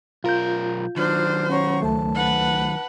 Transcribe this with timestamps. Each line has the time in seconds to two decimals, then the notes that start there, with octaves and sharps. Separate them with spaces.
0.24 B1 F4 A#4 G6
0.96 D#3 F#3 D4 C5 F6
1.49 C#4 C#5 F#5 A#5 C#6
1.82 C#2 A3 A5
2.15 B4 F#5